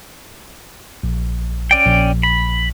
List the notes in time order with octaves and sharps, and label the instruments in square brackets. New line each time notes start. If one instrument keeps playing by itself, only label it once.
[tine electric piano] A#1
[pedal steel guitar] C#4 D5 G5
[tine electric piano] A#1
[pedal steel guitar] B5